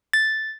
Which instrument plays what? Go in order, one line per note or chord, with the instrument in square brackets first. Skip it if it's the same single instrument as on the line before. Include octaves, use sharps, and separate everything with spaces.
[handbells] A6